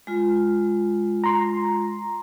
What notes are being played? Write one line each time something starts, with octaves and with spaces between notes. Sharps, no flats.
G#3 F4
A#5 C6